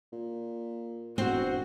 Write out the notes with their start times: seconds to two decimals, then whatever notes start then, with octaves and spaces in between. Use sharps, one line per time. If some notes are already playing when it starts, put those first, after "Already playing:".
0.12 A#2
1.18 E1 C4 F#4